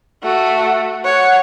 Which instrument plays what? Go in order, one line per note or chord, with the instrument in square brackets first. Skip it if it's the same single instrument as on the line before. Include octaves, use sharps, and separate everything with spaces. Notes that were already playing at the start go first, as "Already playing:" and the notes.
[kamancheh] A3 F#4
[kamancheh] C#5 [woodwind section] F#5